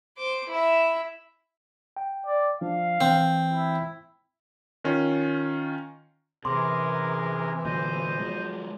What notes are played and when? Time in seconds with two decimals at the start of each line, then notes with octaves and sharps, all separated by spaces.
0.17 C5 D6
0.49 E4 E5
1.97 G5
2.26 D5
2.61 F3 D4 F5
3.01 E3 C4
3.53 E4
4.84 D#3 C#4 F4
6.45 F#2 C3 E3 G#4 A#4 C6 D6
7.65 A#2 D3 F#3 C5 D#5
8.20 F3 F#3 G#3